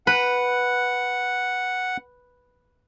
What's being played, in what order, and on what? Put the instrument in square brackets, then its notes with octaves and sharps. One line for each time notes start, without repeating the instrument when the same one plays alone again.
[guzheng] B4 [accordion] F#5